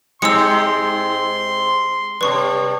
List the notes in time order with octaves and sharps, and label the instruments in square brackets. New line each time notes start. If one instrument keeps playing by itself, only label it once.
[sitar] G#2 C4 G4 [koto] G#3 [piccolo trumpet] C6 [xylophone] E6 C#7
[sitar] G2 C3 [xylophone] B4 C#6